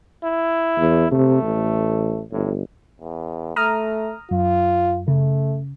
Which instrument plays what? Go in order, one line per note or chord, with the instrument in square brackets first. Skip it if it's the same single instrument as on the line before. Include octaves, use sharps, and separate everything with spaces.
[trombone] E4
[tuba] E2
[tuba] C3 [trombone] A3
[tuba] A1
[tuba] G1 [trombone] A2
[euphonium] E2
[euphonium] A3 [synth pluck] A#5 D#6 F6
[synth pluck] F#2 [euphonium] F4
[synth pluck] C#3 [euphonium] A3